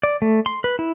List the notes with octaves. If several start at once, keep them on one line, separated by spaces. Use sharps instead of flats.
D5
A3
C6
B4
E4